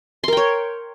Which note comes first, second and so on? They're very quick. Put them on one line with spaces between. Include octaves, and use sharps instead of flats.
C6 A#4 G5 C#5